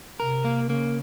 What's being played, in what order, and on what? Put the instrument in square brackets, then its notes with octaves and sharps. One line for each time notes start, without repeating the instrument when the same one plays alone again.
[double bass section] C3 [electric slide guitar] A#4
[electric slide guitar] A#3
[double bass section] C#3 [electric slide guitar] A#3